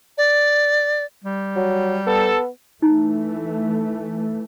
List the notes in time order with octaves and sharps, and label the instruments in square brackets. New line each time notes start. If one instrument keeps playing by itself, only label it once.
[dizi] D5
[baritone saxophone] G3
[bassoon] F#3
[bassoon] B3 [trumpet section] A4
[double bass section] E3 A3 [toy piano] D#4